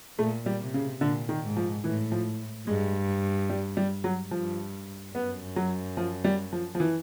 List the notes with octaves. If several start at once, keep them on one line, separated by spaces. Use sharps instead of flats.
A#2 A3
G3
C3
C#3
A#2 D3
D#3
G#2
F3
A2 E3
F3
G2 G#3
G3
G3
F#3
G2 F3
F#2 B3
F#3
F3
G3
F3
F3
E3